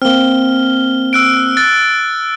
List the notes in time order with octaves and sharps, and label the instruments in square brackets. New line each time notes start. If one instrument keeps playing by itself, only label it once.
[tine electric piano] A#3 C4 [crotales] F6 G7
[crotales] E6 F#6 D7
E6 F#6 A6